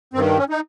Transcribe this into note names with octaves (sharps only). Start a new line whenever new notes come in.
G2 D#3 C4
C#4
D#4